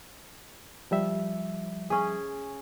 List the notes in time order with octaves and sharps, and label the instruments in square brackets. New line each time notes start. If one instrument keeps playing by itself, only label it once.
[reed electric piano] F3 G3 E5
[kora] C#4 G#4